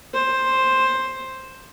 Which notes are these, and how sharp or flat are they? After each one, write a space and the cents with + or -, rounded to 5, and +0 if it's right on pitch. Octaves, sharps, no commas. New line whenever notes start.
C5 +5